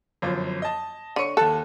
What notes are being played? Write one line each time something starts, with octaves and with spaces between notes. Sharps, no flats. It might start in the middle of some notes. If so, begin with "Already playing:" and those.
G1 F#2 F3
D#5 A5
D3 C#5 C#6 C#7 D#7
D#2 A4 A5 F#6